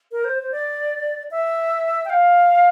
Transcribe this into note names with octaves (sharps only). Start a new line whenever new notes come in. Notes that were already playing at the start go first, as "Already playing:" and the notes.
A#4
C5
C5
D5
E5
G5
F5